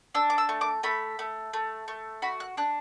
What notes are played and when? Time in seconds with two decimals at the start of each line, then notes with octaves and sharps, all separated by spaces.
0.14 D4 E6
0.30 D6
0.38 E6
0.49 A3
0.61 D6
0.83 A3 B5
1.19 A3
1.53 A3
1.88 A3
2.22 F#4 B5
2.40 F#6
2.57 D4 F#6